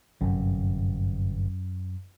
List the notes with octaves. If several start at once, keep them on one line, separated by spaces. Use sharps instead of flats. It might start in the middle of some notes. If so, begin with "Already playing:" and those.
G1 F#2 C3